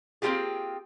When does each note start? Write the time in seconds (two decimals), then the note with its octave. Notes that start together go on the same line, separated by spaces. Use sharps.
0.22 A#3 C4 D#4 F4 G4 G#4